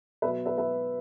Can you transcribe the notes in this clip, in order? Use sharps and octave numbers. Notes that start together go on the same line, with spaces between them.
B2 F#3 B4 E5
B4 E5
B4 E5